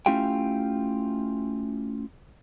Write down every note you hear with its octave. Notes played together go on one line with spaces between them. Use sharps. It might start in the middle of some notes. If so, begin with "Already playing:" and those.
A3 C#4 E4 F4 G4 G5